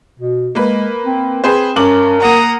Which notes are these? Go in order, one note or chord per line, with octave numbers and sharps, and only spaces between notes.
B2
G#3 A#3 B4
C4
C4 G#4 B4 C5
G2 C#4 A#4 D6 F#7
A#3 F#5 A#5 D#6